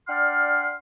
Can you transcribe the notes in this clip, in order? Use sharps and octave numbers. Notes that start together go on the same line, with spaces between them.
D4 D5 F#5 G5 C6 F6